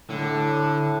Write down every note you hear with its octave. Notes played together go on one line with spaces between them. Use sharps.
A2 D3